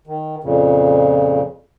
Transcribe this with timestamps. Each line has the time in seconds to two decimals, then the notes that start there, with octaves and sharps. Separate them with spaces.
0.07 D#3
0.44 F2 A#2 C#3